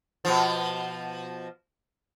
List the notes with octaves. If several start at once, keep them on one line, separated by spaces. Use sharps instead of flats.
B2 F3